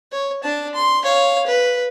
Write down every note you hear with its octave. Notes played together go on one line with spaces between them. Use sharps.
C#5
D4 A5
C6
C#5 F5
B4